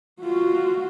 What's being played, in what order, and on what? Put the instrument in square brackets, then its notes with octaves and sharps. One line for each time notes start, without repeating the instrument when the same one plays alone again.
[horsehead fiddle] F4 F#4